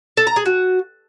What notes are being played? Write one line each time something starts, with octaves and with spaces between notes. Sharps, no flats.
A4
A#5
G#4
F#4